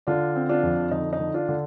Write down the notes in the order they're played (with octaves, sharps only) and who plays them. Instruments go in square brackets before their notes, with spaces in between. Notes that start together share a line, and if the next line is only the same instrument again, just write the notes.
[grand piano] D3 D4 F4
C4
D4 F4
F2
D3 D#4
D#4
D3
D4 F4
D3